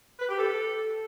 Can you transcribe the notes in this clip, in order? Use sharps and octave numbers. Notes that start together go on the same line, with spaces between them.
B4
G4
A4